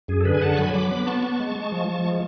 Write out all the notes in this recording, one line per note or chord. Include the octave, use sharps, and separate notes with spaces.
F#2 G#4
A4
D3 G#4 B4
G#5
D3 F#5 A5
C#6
F#3 G#5 B5
F#3 B5 D6
B3
B3 A5 C#6
B3
G#3
G#3
F3
F3
G#3